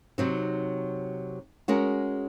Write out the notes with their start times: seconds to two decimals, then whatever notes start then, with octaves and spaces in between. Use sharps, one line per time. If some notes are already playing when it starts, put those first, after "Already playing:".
0.18 C3 F#3 C4 D#4
1.68 G#3 C#4 F#4 A#4